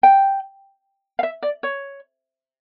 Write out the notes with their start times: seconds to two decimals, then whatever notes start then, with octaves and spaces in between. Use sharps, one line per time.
0.03 G5
1.19 F5
1.23 E5
1.43 D5
1.63 C#5